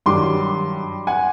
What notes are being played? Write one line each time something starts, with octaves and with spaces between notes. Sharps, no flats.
G2 D#3 F#3 C6 D6
F#5 G#5